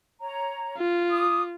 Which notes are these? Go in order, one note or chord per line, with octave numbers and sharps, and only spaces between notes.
C#5 A#5
F4
D6 D#6